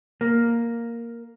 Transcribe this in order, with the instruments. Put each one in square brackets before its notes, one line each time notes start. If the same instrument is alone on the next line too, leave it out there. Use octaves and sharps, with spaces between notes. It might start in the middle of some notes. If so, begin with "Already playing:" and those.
[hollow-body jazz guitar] A#3